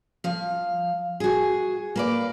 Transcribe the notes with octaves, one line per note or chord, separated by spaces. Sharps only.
F3 F5
F#4 G#4
A#3 B4 D5